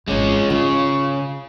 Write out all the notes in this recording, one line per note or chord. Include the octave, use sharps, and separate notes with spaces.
G#1 E3 G#3 C#4
C#3 F4